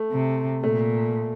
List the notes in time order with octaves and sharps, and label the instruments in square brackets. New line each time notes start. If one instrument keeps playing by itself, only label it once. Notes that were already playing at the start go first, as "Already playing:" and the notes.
Already playing: [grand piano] A3
[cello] C3
[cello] A#2 [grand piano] A3